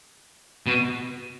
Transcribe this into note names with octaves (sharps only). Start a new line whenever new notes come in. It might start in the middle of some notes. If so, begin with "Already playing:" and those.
B2